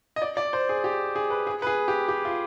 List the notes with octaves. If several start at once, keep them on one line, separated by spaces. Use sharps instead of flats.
D#5
D5
D5
C5
G#4
G4
G#4
B4
G#4
B4
G#4
G4
G4
F4